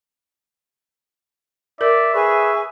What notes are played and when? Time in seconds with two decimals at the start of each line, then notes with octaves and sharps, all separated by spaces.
1.81 A#4 D5 E5
2.14 G#4 B4 G#5 C#6